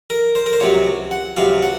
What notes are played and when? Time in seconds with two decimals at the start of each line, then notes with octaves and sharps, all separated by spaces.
0.10 A#4
0.35 C5
0.46 A#4
0.53 C5
0.60 C#2 C3 F#3 C#5
1.11 F#5
1.37 C#2 C3 F#3 F5
1.62 F#5